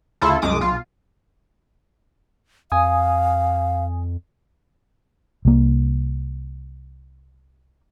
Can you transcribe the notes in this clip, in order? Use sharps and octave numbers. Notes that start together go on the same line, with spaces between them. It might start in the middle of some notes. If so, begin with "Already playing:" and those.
D2 C#3 E4 F4 A4
C2 F#2 G#3 D6 D#6
B1 F4
F2 F5 G#5 D#6
C2 A#3